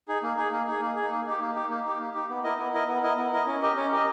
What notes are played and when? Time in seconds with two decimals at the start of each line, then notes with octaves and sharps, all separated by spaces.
0.08 D#4 G#4
0.23 A#3
0.37 D#4 G#4
0.52 A#3
0.67 D#4 G#4
0.82 A#3
0.96 G#4
1.01 D#4
1.11 A#3
1.26 D#4 G4
1.41 A#3
1.55 D#4 G4
1.70 A#3
1.85 D#4 G4
1.99 A#3
2.14 D#4 G4
2.30 B3
2.44 E4 A#4 D#5
2.59 B3
2.73 E4 A#4 D#5
2.88 B3
3.03 E4 A#4 D#5
3.17 B3
3.32 E4 A#4 D#5
3.47 C#4
3.62 G4 A#4 D#5
3.77 C#4
3.92 G4 A#4 D#5